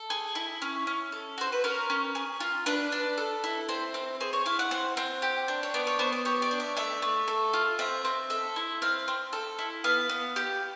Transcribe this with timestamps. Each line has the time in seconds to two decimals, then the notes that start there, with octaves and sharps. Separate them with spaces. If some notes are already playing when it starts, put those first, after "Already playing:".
Already playing: A4
0.10 G#4
0.35 E4
0.62 C#4
0.87 C#4
1.12 A4
1.38 F#4 C5
1.52 B4
1.64 C#4 A#4
1.90 C#4
2.15 G#4
2.40 F4
2.66 D4 B4
2.92 D4
3.18 A4
3.44 E4
3.69 C4 C5
3.94 C4
4.20 G#4 C5
4.33 C#5
4.46 E4 F5
4.59 F#5
4.71 C4
4.97 C4
5.22 G4
5.48 D4
5.63 C#5
5.74 B3 D5
5.87 C#5
5.99 B3 C5
6.12 D5
6.25 G4 C#5
6.42 D5
6.51 D4
6.60 E5
6.77 A3 E5
7.02 A3
7.28 A4
7.53 F4
7.79 C4 E5
8.05 C4
8.30 A4 E5
8.56 E4
8.82 C4 F5
9.08 C4
9.33 A4
9.59 E4
9.84 B3 F5
10.09 B3
10.36 G4